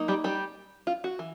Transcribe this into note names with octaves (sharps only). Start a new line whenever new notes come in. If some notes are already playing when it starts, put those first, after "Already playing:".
Already playing: F#3 A#3 D#4
G3 G4
G3 G4
F4
F#4
E3